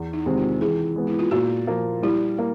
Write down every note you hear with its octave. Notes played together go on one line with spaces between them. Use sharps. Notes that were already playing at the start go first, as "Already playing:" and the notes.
Already playing: E2
D#4
C3 D#3 G#3 C4
F4
E3 G#4
G#3 B3
E4
F4
A#2 F#4
F3 A#3
G3 E4
A#3